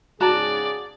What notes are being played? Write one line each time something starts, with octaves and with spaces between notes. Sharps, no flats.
G#2 C#3 F#4 G#4 D5 A5 A#5